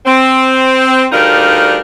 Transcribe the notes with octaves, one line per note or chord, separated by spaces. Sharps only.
C4
D2 G3 D4 D#4 A#4 F5